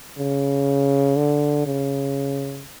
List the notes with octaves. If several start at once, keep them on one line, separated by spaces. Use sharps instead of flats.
C#3
D3
C#3